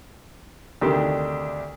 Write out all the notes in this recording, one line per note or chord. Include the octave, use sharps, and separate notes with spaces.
D2 C3 D#3 D4 G4